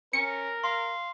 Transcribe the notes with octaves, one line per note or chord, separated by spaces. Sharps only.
C#4 A#4 C#7
F5 C6